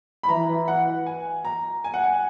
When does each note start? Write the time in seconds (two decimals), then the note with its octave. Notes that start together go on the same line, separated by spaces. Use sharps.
0.23 B5
0.29 E3 A#5
0.68 F#5
1.06 G#5
1.45 A#5
1.84 G#5
1.94 F#5
2.04 G#5